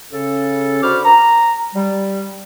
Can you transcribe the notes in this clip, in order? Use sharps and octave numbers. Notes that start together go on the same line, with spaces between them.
C#3 C#4 A4
D3 F#4 C5 B5 D6 F6
A#5
G3